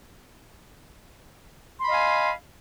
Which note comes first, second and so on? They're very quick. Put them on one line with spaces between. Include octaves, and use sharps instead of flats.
C6 B5 D#5 F5 G#5